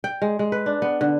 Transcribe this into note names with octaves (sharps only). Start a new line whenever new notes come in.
G5
G#3
G#3
B4
D4
B3
D3